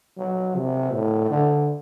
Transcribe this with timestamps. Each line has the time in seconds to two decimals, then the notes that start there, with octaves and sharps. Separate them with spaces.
0.18 F#3
0.55 C3
0.93 A2
1.30 D3